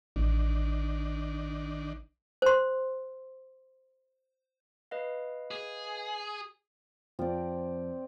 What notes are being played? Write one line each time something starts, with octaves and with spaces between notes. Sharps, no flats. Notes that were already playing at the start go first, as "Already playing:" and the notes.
A1 D#3 D4
C5 C6
B4 D#5 F5
G#4
F2 F3 C4 D5